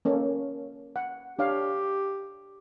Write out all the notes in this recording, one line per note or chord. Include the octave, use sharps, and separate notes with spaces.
A#3 C#4 A4
F#5
D4 G4 C#5 F5